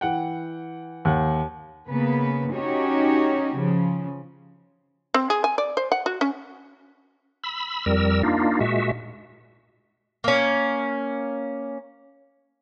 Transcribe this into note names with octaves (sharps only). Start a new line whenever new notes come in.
E3 F#5 G5
D#2 F#5
C#3 A#3 B3 B4
C#4 D#4 F#4 G4 C#5
C#3 F3
C4
G#4
G#5
D5
C5
F#5
F#4
C#4
B5 E6
F2 G3 A#4 E6
A#3 D4 D#4 F4
A#2 G#3 F#4 E5
A#3 C#4